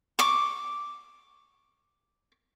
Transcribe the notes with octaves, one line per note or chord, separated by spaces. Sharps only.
C#6 D6